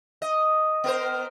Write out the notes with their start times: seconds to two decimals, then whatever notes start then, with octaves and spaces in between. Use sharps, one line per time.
0.22 D#5
0.84 B3 A#4 C5